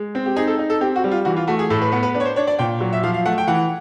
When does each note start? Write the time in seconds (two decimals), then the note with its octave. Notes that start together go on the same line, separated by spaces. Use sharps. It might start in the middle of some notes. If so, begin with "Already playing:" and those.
Already playing: G#3
0.15 C4
0.26 G4
0.36 D#4 G#4
0.47 A4
0.59 D#4
0.70 A4
0.81 C4 G4
0.96 F#4
1.04 G3
1.11 F4
1.25 E3 F#4
1.37 F4
1.48 A3 F#4
1.59 G#4
1.70 A2 A4
1.82 B4
1.92 B3 B4
2.03 B4
2.14 D4 B4
2.20 C#5
2.25 C5
2.36 D4 C#5
2.47 D5
2.59 A#2 G5
2.80 F#3
2.93 E5
3.03 F3 F5
3.14 F5
3.26 A3 F#5
3.38 G5
3.47 E3 F#5